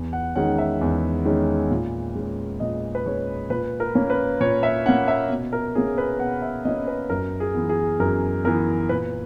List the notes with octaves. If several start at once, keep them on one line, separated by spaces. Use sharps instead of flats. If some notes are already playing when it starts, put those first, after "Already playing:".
Already playing: E2
F#5
D#3 G#3 C#4 F#5
E5
E2
D#3 G#3 C#4
A#2
G#3 C#4
A#2 D#5
B4
G#3 C#4 C#5
A#2 B4
A#4
A#3 C#4
B4
A#2 C#5
E5
A#3 C#4 F#5
E5
B2
A#4
A#3 C#4 G#4
B4
B2 F#5
E5
A#3 C#4 D#5
B4
F#2 A#4
G#4
E3 B3
G#4
F#2 A#4
E3 B3 A#4
A#2 B4